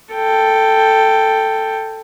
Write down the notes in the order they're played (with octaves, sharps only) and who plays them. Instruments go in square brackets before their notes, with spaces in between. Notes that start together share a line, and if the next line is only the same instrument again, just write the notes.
[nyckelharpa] A4 G5